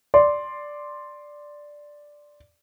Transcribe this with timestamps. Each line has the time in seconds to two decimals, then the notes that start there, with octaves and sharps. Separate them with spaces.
0.14 D5 C6